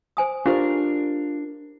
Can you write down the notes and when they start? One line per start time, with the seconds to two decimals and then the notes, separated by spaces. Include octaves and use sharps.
0.17 C5 G#5 D#6
0.46 D4 F4 G4 A4 A#4 C5